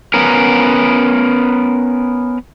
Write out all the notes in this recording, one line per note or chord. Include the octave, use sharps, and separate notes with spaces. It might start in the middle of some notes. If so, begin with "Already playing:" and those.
B3 C#4 A#4